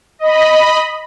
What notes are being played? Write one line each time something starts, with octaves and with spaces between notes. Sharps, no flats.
D#5 B5